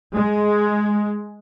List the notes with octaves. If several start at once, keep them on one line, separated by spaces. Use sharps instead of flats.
G#3